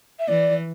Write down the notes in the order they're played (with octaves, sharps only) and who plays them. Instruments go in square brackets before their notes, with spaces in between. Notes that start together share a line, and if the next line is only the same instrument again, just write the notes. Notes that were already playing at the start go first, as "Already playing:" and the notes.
[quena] E5
[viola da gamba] E3 [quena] D5